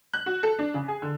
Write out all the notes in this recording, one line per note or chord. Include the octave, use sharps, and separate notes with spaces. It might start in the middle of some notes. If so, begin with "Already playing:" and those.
F#6
F#4
A4
D4
C#3
G#4
D3